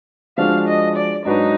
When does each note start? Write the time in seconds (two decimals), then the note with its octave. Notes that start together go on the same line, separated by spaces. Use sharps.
0.38 F3 G#3 D4 F#4 F5
0.68 D#5
0.96 D5
1.25 G#2 F#3 D4 D#4 F#4 B4